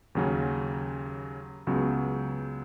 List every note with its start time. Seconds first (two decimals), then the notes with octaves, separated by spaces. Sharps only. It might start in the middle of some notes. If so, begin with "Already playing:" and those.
0.15 D#2 C#3 F#3 C#4
1.67 C#2 C#3 F#3 B3